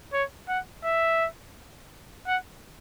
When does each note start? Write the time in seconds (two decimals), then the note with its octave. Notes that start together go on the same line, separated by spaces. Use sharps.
0.13 C#5
0.48 F#5
0.84 E5
2.26 F#5